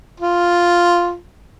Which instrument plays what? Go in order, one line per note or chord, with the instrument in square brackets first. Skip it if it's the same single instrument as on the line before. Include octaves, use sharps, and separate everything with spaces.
[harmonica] F4